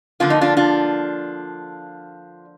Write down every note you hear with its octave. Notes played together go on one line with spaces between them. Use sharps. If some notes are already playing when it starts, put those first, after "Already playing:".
D3 F3 A#3 F4
D#4
D4 F4
D4 F4